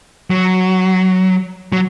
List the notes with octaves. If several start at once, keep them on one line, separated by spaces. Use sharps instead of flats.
F#3
F#3